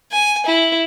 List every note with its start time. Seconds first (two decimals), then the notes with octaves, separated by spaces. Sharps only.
0.12 G#5
0.46 E4